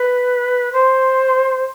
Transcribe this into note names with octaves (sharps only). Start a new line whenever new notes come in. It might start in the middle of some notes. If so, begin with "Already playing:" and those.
Already playing: B4
C5